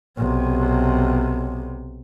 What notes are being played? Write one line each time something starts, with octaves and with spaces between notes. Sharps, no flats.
B1 C3